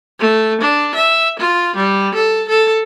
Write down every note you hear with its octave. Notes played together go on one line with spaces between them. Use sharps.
A3
D4
E5
F4
G3
A4
A4